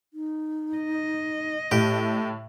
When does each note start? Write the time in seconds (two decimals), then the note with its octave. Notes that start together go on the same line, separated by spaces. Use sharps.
0.14 D#4
0.78 D#5
1.71 A2 A3 G4